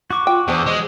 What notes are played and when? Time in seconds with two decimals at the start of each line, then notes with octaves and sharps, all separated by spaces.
0.10 F#4 C#6 D6
0.27 F4 G5
0.48 E2 B3 D4 C5
0.66 G#3